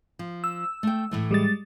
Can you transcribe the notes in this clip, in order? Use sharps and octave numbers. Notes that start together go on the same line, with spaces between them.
F3
E6
A3 G5
A2 E3 A3
G3 G#3 A6